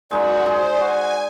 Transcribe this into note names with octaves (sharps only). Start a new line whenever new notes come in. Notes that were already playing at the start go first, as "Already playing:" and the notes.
F#2 G#3 D#4 F#4 D5
G#4 C5
F#4 G#5